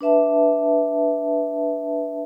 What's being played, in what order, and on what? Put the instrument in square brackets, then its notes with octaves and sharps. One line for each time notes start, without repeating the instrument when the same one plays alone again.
[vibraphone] D4 B4 E5 A5